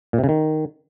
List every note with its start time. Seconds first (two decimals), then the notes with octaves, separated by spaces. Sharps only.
0.13 A#2
0.18 C3
0.24 C#3
0.29 D#3